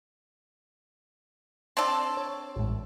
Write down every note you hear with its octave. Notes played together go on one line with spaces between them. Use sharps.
C4 D4 A4
C#5
A1 G#2